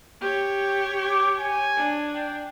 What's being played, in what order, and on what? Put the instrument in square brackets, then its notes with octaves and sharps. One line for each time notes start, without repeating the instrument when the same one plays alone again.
[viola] G4 C#5
[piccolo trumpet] D6
G#5
[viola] D4
[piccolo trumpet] G5